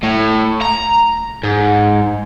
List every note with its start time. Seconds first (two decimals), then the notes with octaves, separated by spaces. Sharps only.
0.03 A2
0.62 A#5
1.43 G#2